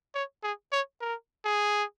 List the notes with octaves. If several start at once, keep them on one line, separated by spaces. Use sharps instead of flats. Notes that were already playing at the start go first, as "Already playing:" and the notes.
C#5
G#4
C#5
A#4
G#4